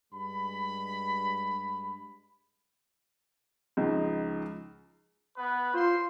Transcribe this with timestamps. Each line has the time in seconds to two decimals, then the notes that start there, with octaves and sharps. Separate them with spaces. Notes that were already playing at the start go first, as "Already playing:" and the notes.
0.13 G2 G#3 B5
3.77 C#2 F3 D#4
5.37 B3 B4
5.74 F4 C5 C6